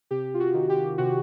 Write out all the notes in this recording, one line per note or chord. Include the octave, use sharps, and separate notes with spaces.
C3 G4
F4
F#4
D#3
G4
C3 F#4